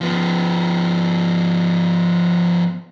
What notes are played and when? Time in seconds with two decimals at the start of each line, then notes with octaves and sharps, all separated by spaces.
0.01 F3 B3